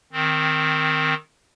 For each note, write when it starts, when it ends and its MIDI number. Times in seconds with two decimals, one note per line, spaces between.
0.13 1.14 51
0.13 1.14 60